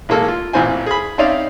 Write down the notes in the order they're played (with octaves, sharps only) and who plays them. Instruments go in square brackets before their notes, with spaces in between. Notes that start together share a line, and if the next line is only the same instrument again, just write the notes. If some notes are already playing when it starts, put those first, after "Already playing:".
[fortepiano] A1 G#3 A#3 A4
F4
A1 A#2 E3 C4 C5 G#5
G#4 B5
C4 C#4 D#4 D5 E5 F5